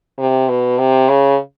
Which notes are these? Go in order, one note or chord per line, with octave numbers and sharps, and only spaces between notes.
C3
B2
C3
C#3